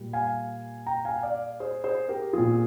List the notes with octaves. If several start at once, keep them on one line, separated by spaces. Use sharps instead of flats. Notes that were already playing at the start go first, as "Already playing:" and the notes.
Already playing: A#2 G3
F5 G#5
G5 A#5
F5 G#5
D5 F5
G#4 C5
G#4 C5
G4 A#4
A#2 F3 F4 G#4